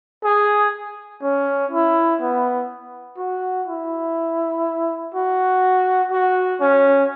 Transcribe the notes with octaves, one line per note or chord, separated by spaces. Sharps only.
G#4
C#4
E4
B3
F#4
E4
F#4
F#4
C#4